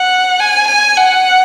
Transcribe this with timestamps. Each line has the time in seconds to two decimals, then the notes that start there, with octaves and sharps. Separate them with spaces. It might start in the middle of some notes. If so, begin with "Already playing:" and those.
Already playing: F#5
0.40 G#5
0.68 G#5
0.97 F#5